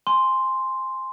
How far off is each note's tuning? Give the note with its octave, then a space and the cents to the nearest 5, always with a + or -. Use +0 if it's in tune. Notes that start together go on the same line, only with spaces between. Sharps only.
G#5 +0 C6 +0